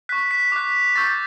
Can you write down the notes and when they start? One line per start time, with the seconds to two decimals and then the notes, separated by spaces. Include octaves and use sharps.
0.09 C#6 F#6 B6
0.31 B6
0.52 D6 F#6
0.96 C#6 E6 G6 A6